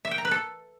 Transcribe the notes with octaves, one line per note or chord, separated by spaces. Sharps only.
E5
G5
A#5
B4
A4